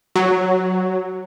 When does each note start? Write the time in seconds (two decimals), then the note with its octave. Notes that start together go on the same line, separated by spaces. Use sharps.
0.16 F#3